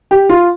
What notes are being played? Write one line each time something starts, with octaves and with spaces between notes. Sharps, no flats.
G4
F4